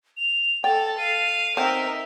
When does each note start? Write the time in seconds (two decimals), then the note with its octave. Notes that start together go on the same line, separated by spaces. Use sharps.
0.17 F7
0.64 A4 G5 A6
0.98 F5 D#7
1.57 C4 D#4 A#4 C5 E5